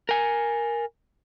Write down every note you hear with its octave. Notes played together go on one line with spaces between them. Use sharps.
A#4 G#5